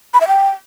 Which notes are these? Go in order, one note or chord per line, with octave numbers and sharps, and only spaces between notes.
B5
E5
G5